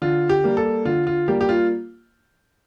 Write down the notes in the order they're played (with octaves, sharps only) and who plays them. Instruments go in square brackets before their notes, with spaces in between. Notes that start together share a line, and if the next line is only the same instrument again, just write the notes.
[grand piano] D3 F4
G4
G3 A#3
A4
D3 F4
F4
G3 A#3 G4
G4
F4